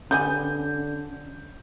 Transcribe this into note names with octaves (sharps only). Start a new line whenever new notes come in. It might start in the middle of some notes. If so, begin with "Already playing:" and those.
D3 G3 B3 C#4 G#5 G6